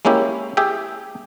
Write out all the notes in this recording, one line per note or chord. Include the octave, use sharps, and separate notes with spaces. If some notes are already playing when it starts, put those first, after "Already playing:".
G#3 A#3 C#4 E4 G4
G4 G#4 E5 G5